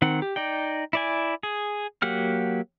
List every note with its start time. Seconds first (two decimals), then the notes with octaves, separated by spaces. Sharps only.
0.02 D#3 C4 F#5
0.22 G4
0.36 D#4 D5 G5
0.93 E4 D5 G#5
1.43 G#4
2.02 F#3 A#3 G4 F#5 F6